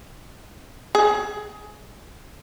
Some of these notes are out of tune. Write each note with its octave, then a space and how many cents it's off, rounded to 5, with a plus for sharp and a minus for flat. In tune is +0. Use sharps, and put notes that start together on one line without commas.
G#4 +20